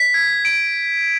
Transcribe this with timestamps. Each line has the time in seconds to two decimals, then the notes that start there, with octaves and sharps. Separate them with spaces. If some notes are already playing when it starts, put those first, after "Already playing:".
Already playing: B6
0.14 G#6
0.45 D7